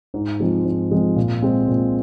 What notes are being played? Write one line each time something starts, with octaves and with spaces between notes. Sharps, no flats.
G#2
F3 G#3 C4 F4
G#2
F3 G#3 C4 F4
A#2
G#3 C4
A#2